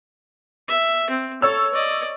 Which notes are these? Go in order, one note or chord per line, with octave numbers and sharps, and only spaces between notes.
E5
C4
A4 C#5 E6
D5 D#5